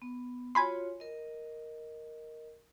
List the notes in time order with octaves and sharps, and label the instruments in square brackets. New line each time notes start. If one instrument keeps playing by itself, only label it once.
[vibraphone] B3
[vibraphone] F4 F#4 C#5 [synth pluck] G#5 B5 C6
[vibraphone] A#4 D#5